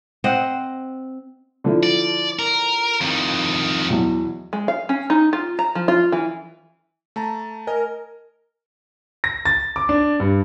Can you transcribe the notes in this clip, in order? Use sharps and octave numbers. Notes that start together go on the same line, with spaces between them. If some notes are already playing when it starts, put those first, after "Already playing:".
C4 C5 D#5 F#5
D3 F3 E4
D5
A#4
F2 D#3
E2 B2 F#3
G#3
F5
C#4
D#4
F4
A#5
F3
F4
E3
A3 A5 A#5
A#4 D#5 G#5
A#6
A6
D6
D4
G2